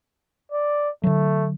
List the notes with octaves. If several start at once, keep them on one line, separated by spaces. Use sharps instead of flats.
D5
D3 F#3 A3